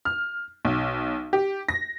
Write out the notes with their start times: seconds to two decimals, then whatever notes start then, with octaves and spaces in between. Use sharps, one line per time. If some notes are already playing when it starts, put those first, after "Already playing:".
0.05 F6
0.65 B1
1.33 G4
1.69 A#6